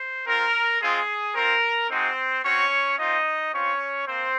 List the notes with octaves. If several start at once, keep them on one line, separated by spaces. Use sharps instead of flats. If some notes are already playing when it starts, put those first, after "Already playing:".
Already playing: C5
C4 F4 A#4
G#3 C4 F4 G#4
C4 F4 A#4
G#3 C4 D#4 F#4 C5
C4 C#4 F#4 C#5
C4 D#4 F4 D#5
C4 C#4 F4 C#5
A#3 C4 C5